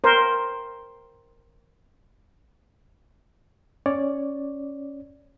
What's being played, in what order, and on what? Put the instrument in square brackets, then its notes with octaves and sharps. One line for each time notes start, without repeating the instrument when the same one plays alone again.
[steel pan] A#4 C5
[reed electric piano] C#4 C#5 D5